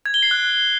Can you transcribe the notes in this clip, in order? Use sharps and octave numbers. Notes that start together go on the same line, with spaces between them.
G#6
G7
C7
F#6